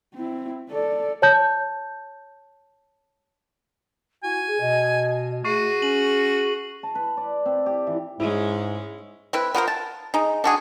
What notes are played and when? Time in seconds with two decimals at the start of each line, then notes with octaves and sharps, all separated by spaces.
0.14 C4 E4
0.70 A4 D5
1.22 C#5 A5 G6
4.23 E4 F#4 G#5
4.47 G#4
4.60 B2 D#5
5.45 A3 F#4 G#4 C#6 C7 D#7
5.82 C#4 F#7
6.83 A5
6.95 B4
7.17 D5
7.46 C4
7.66 G4
7.87 E3
8.20 G#2 G#3 C#4 E4
9.33 C4 E4 B4
9.54 B3 F4 A#4 C5
9.68 A5
10.14 G#3 D#4
10.44 D4 F#4 G#4